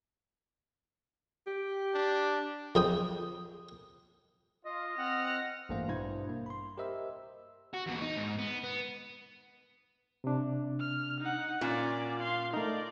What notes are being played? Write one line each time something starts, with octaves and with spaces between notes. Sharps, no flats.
G4
D4
F2 G#4 G5 D#6
F4 D#5
C4 F#5 F6 A#6
A1 G2 A3 A#3 C5 F5
G2 B2 E4 C5 G#6
A#3
B5 C6
G4 A#4 C5 D#5 E5 E6
F#4
D#2 B2
D#4
G#2
B3
B3
C3 D4
F6
D#4 F#5
A#2 C#4 F4 D5
F5 C6
A3 D#4 A#4 D5